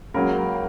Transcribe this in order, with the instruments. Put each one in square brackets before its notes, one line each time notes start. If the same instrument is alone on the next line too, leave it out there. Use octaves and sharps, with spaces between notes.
[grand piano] C#2 C#3 F#3 A#3 A#4